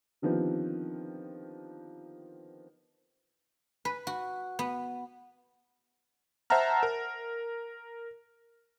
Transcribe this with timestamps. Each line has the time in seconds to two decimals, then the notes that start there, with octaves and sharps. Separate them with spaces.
0.22 D3 D#3 F3 B3 C4 G4
3.85 B4
4.07 F#4
4.59 B3
6.50 C5 E5 F#5 A5 A#5 F6
6.83 A#4